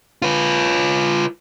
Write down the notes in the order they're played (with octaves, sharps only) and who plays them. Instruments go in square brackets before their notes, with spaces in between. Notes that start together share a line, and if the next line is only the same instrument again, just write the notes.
[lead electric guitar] F4 B4